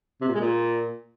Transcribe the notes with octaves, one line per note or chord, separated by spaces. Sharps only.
C3
A#2
G#3
A#2